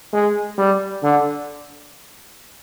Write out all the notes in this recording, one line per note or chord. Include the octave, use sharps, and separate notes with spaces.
G#3
G3
D3